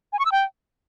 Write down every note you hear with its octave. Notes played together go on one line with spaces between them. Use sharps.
G#5
C#6
E6
G5